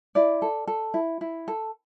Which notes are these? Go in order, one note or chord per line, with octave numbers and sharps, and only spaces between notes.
E4 D5
A4
A4
E4
E4
A4